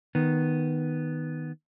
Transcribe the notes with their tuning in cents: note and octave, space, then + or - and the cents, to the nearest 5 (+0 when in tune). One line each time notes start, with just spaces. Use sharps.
D#3 +0 B3 +0